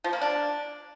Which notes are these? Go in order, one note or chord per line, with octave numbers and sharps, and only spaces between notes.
F3
A#3
D4